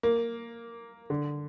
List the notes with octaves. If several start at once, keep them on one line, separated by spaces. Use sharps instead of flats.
A#3
D3